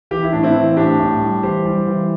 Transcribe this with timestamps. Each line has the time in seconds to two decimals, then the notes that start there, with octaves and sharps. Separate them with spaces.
0.11 E3 G4
0.23 E4
0.33 A2 D4
0.43 C4 E4
0.56 E3
0.77 A2 D4 G4
1.00 A2
1.21 G3
1.43 E3 G4 C5
1.65 G3
1.87 E3